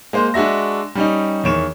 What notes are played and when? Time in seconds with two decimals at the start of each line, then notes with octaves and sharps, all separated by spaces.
0.13 G#3 A#3 C5
0.34 G#3 D4 F#4 E5 A#6
0.95 G3 C#4 D#4
1.44 E2 D#3 C#5 D7 E7